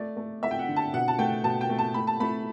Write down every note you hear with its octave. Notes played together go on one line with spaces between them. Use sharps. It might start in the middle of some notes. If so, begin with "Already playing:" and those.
Already playing: A3 D5
A3
A3 E5
G5
F#5
D3
A5
B2 F#5
A5
A3 G5
B2 A5
G5
A3
A5
A3 B5
A5
A3 B5